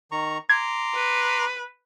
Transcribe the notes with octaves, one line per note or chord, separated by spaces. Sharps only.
D#3 A#5 C#6
A#5 C6 D6 G#6
B4